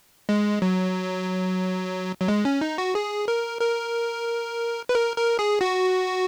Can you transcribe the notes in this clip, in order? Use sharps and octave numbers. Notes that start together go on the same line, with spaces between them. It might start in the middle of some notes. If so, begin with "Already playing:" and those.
G#3
F#3
F#3
G#3
C#4
D#4
F#4
G#4
A#4
A#4
B4
A#4
A#4
G#4
F#4